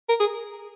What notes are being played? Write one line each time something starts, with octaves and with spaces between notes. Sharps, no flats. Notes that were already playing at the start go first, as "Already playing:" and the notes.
A#4
G#4